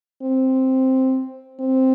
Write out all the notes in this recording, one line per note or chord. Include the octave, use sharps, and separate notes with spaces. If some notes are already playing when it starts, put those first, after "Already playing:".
C4
C4